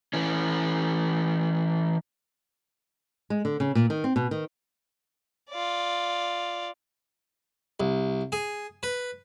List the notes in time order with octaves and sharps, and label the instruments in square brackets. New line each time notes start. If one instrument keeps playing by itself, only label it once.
[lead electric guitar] E3 C#4
[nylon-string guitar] G#3
D3
C#3
A#2
D#3
C4
B2
D#3
[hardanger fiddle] F4 D5
[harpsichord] C2
G#4
B4